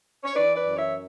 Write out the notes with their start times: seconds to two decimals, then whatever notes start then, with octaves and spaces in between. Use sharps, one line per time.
0.24 C#5
0.36 E3 B4 D5
0.56 B4 D5
0.66 F#2
0.75 C#5 E5